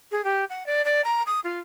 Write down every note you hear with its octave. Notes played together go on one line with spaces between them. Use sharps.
G#4
G4
F#5
D5
D5
A#5
D#6
F4